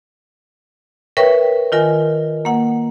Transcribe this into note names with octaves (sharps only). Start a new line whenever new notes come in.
A#4 B4 C#5 E5 G5 C#6
D#3 F4 A#4 G#5
A#3 F#5